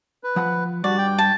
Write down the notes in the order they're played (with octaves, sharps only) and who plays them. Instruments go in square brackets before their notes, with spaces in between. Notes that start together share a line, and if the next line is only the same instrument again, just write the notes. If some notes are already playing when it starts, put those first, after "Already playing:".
[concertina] B4
[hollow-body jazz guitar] F3 F#5 B5
[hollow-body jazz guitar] G2 G3 [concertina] F#4 [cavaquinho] D5
[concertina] G5
[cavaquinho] A5